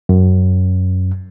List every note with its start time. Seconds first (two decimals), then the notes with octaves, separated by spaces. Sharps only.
0.09 F#2